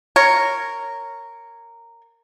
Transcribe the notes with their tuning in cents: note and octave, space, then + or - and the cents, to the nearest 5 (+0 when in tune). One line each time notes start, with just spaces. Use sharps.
A#4 -10 C#5 +0